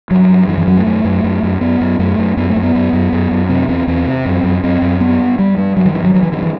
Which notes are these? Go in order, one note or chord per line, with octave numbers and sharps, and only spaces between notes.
G2 F#3
G2
F#2 E3
E3
F#2 F#3
A3
F#2
F#2
F#2
F#2
F#2 B3
F#2
F#2 A3
F#2
F#2 B3
A3
F#2
B3
F#2
F#2
F#2
F#2
C3 C4
E2 C4
E2 C4
C3
F#2
F#2
F#2 C4
F#2
G2 B3
G2
G2 G3
G2 G3
G2 F#3
D#3
G2 E3
F#3
G2 F#3
E3
G2 D#3
E3